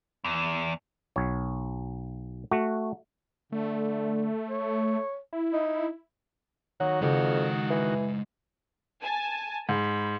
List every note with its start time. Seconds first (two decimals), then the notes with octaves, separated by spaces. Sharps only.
0.24 E2
1.16 B1 C#5
2.51 A3 F#4
3.52 D3 A3
4.50 C#5
5.33 E4
5.53 D#4
6.80 D#3 F#3 A#3 F#4
7.02 F2 C#3 G#3 G4 A4 F#5
7.70 E3
9.02 G#5 A5
9.69 G#2 B5